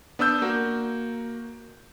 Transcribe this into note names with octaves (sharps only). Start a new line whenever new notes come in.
B3 D4 B4 E6 G6
A#3 F#4